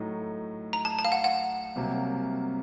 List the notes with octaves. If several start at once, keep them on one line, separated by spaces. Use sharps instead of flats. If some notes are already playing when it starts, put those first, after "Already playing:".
Already playing: A2 F#3 A3 D#4
A#5
A5
A5
F5
F#5
F#5
C2 C3 F#3 A#3